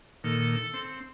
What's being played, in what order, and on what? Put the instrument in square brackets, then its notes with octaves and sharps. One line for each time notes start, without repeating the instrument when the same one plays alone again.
[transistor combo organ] A#2 D#3 [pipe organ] A4
[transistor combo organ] C4